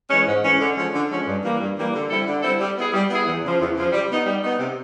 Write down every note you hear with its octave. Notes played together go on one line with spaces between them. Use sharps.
E3 G#3 C#4
G#2
E3 G#3 C#4
D3
F3 G#3 C#4
D3
F3 G#3 C#4
G2
E3 G3 A#3
G2
E3 G3 A#3
D3
G3 C4 E4 A4
D3
G3 C4 E4 A4
G3
B3 E4 G#4
G3
B3 E4 G#4
E2
C#3 F3
E2
C#3 F3
G3
B3 D#4
G3
B3 D#4
C3